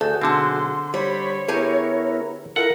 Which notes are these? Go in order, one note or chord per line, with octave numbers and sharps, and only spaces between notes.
D2 F#4 G#4 A4 G6
B1 D3 C4 A5 C6
G3 C5 C#5 B5
B3 E4 G4 G#4 A#4 G#5
E4 F4 A4 A#4 F#5